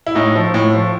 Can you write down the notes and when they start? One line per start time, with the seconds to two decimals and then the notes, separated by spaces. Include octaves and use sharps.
0.07 E4
0.15 A2 D#4
0.35 F3
0.54 A2
0.74 F3